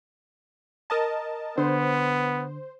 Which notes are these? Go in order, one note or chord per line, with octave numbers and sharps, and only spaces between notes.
A#4 D#5 A5
D3 B3 C5